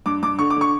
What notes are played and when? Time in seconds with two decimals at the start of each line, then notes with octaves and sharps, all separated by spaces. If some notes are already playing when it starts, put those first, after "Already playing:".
0.06 G2 D6
0.22 G2 D6
0.39 D3 C#6
0.50 D6
0.56 D3 C#6